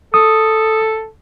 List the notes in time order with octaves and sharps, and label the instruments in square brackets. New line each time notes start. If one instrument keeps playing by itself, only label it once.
[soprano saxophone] A4 [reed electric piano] D#6